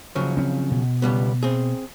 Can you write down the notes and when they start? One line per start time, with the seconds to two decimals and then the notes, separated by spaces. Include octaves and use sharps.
0.15 C#3 F3 F#3
0.37 C4 C#4
0.71 B2
1.02 C#2 G3 B3
1.43 C4 G#4